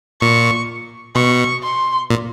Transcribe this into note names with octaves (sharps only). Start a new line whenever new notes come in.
A#2 C#6
B2 C#6
C6
A#2